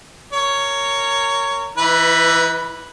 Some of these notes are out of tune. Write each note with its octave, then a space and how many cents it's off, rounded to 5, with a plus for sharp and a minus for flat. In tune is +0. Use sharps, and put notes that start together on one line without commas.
A#4 -20 C#5 +10
E3 +20 E4 -45 B4 +0